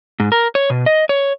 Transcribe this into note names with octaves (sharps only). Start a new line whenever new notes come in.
G#2
A#4
C#5
B2
D#5
C#5